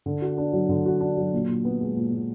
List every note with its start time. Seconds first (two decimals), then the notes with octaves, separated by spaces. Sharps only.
0.06 D3
0.22 F#4
0.38 D4
0.53 F#3
0.69 D3
0.86 F#4
1.00 D4
1.17 F#3
1.33 A#2
1.48 A#2
1.65 B3
1.80 G#3
1.96 A#2
2.12 A#2